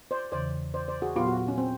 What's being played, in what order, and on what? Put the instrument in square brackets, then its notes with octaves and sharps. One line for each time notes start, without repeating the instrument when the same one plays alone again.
[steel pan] C5 D5
[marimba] E2 C#3 E3 [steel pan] C5 D5
[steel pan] C5 D5
C5 D5
F#4 G#4
[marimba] A#2 F#3 B3 [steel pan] F4 G4
[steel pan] F#4
F#4
C#4
C4